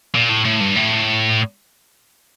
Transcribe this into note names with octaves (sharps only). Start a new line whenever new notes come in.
A#2
A2
A2
G2
A2